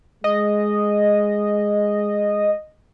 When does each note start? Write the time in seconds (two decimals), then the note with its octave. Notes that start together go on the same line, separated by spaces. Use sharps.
0.24 G#3 D#5